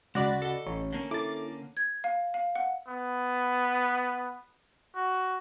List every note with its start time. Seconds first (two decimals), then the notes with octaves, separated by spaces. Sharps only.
0.15 D2 C#3 G#3 F#4 D5 B5
0.42 A4 D#5
0.67 A1 C#5
0.93 D3 A#3 C#4
1.11 E4 A4 D6 A6
1.77 G#6
2.04 F5
2.34 F5
2.55 F#5
2.88 B3
4.96 F#4